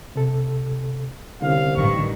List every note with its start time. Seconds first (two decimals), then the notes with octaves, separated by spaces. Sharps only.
0.16 C3 A4
1.42 C2 D3 C#4 F5
1.76 A1 G2 D#3 C#6